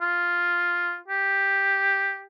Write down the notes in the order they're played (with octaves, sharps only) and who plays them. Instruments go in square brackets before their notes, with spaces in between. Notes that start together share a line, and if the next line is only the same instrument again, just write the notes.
[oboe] F4
G4